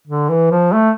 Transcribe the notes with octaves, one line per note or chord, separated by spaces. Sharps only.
D3
E3
F3
A3